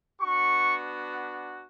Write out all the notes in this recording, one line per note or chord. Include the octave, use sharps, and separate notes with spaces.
B3 D4 F#4 C#6